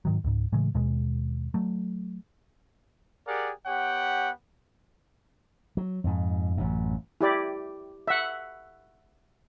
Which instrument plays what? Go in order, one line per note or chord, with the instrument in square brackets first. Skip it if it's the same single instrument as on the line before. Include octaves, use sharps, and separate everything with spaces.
[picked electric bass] G#2 D#3 F#3
C#2 G#2
A2 C#3 E3 G#3
D#2 B2 G#3
F#3 A3
[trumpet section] G4 G#4 A#4 D5 F#5
B3 G4 C#5 F#5 G5
[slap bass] F#3
F2 G#2
A1 F#2
[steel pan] E4 G4 D5
E5 F#5